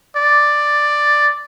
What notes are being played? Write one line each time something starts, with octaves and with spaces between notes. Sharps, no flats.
D5